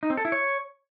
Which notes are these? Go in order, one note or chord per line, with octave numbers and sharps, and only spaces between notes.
D#4
C4
A4
E4
C#5